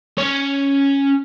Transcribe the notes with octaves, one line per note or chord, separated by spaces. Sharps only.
C#4 C#5